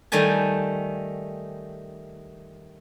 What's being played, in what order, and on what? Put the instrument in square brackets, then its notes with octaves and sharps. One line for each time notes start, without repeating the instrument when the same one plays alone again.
[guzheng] D#3 G3 A3 G#5 A5